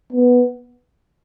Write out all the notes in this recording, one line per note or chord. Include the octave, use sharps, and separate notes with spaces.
B3